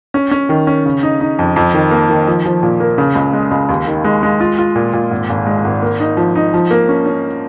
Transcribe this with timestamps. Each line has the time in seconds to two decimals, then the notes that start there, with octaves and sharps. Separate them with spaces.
0.14 C#4
0.31 C#4
0.49 D#3
0.67 C#4
0.86 C#3
1.03 D#4
1.21 D#4
1.39 F2
1.56 F2
1.74 D#3
1.91 A#3
2.10 D#3
2.27 F3
2.46 F3
2.63 A#2
2.80 A#3
2.98 C#3
3.15 C#2
3.33 G#3
3.51 C#2
3.69 D#2
3.87 D#3
4.04 G#3
4.23 G#3
4.40 F4
4.58 F4
4.75 A#2
4.93 A#2
5.11 G#1
5.29 G#1
5.47 G#3
5.64 G#1
5.82 A#3
6.00 D#4
6.17 F3
6.35 D#4
6.54 F3
6.71 A#3
6.89 C#4
7.06 C#4